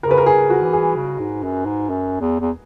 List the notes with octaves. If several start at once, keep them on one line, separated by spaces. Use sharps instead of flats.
C#3 A#4
B4
A#4
G#4
C#3
F#4
D#3
E3
G#4
C#3
G#2
F#2
G#2
F#2
E2
E2